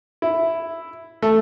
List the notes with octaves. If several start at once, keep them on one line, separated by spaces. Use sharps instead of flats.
E4
A3